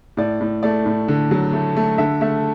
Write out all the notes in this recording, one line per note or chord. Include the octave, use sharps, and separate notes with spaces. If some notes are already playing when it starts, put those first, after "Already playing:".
A2 D5
A2
A3 D5
A2
D3
F#3
A3
A3
D3 E5
A3 E5